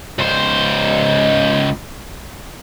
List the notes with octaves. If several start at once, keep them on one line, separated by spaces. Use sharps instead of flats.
C#2 C5